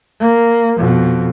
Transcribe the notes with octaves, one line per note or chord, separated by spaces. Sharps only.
A#3
F2 B2